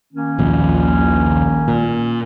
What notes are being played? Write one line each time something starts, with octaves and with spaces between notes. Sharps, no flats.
D#3 A#3 C#4
A#1 D#2 A#2
A#2